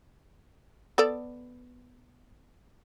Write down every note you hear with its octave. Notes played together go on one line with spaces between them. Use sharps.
B3 A4 D5